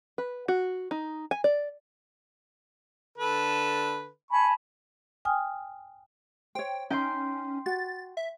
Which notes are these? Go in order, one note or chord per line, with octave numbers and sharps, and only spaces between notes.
B4
F#4
D#4
G#5
D5
D3 A4 B4
G#5 A5 B5 C#6
G5 G#5 D#6 F6
C5 C#5 G5
C#4 D#4 C#5 G5 A#5 C6
F#4 A6
E5